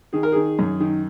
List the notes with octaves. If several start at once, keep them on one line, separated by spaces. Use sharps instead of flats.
D#3 G#4
A#4
D#3 G#4
F#2
D#3